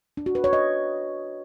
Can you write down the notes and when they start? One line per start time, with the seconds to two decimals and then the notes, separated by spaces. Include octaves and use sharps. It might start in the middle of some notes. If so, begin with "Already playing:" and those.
0.17 D4
0.26 F#4
0.35 B4
0.44 C#5
0.53 D#5